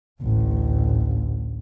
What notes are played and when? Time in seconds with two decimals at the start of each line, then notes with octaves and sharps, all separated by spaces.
0.22 A1 D2